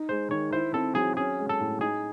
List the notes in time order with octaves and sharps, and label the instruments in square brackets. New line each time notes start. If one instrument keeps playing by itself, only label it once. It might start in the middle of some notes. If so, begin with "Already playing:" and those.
Already playing: [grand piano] D#4
[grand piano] G#3 [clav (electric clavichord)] C5
[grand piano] D#3 [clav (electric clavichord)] C#5
[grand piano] E4 [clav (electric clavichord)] C5
[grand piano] C4 [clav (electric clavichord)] A4
[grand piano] F#3 [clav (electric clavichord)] G#4
[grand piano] C#4 [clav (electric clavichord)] G#4
[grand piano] G#3
[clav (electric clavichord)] A4
[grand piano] A2
[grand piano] D#4 [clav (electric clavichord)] G#4